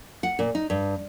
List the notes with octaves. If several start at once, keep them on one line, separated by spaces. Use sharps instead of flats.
F#5
A#2
D#4
G2